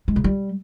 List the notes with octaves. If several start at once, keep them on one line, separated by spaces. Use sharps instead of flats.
G#3
C#3
G3